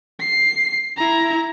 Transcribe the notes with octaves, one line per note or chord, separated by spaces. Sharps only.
C7
E4 A#5